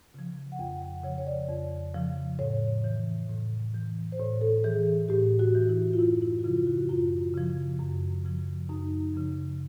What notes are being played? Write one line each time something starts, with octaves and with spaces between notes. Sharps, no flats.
C#3 F3
F#5
F2 G5
F#5
C#3 F3 C#5
C#5
D5
F2
C#3 F3
A2 C#5
E3
A2
E3
C5
A2 C#5
A4
E3 G#4
A2 G4
F#4
E3
E4
F4
F#2 E4
E4
F#4
C#3 F3 F4
F4
F#4
F#2 F4
C#3 F3
F#2
C#3 F3
F#2 D#4
C#3 F3